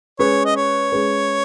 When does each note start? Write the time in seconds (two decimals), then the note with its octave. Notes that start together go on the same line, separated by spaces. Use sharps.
0.19 G#3 C#4 G#4 B4 C#5
0.45 D#5
0.56 C#5
0.92 G#3 C#4 G#4 B4